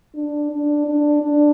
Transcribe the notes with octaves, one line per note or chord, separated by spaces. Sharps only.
D4
D4
D4
D4